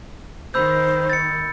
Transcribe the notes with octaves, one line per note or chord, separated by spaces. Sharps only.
D#3 C5 B5 E6 G6
A6 C#7